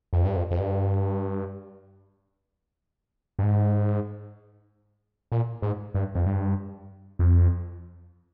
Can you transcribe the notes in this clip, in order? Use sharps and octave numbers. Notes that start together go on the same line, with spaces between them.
F2
G2
F2
F2
G2
G2
G#2
A#2
G#2
G2
F2
G2
F2